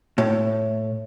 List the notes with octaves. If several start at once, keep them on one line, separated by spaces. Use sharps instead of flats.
A2